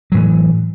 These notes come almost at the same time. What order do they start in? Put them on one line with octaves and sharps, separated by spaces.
F#3 A2 E3